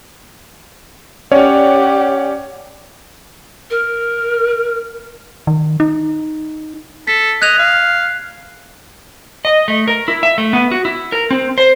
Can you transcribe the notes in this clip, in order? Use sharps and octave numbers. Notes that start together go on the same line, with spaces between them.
C#4 G4 C#5 D5 F#5
A#4
D#3
D#4
A4 B6
D#5 F#6 G#6 F7
F5
D#5
A3
A#4
E4
E5
A3
B3
F#4
E4
A#4
C4
C5